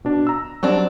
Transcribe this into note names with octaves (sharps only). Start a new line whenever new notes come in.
B2 D4
A#5 E6
F#3 G3 C4 D4